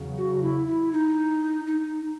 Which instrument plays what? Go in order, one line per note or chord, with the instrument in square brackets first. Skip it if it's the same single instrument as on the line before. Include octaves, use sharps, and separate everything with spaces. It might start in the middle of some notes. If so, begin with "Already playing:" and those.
Already playing: [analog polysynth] E2 C#3 F#3
[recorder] F#4
E4
E4
D#4
D#4